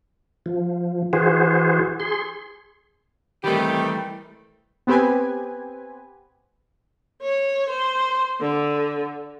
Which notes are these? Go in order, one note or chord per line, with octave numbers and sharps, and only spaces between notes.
F3
E3 F#4 G#4 C5
G#4 C6
C3 D#3 E3 G3 A3 G4
B3 C4 G4 B4 G#5
C#5
C5
D3